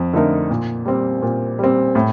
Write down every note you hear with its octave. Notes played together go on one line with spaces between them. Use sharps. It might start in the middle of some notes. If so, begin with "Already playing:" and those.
Already playing: F2
D3 A3 D#4 A#4
A#2
G3 C4
A#2
G3 C4
A2